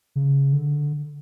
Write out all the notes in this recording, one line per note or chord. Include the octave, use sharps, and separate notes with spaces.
C#3
D3